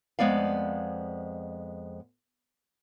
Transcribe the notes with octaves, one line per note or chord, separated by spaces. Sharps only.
F2 G#3 B3 D5 F5